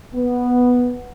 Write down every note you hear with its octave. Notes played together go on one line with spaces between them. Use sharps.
B3